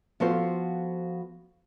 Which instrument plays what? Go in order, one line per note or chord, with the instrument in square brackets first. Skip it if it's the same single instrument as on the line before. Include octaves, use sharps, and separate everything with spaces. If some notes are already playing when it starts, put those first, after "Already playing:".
[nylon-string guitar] F3 B3 F#4 A4 C5 F5